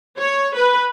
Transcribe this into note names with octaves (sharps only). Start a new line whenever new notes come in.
C#5
B4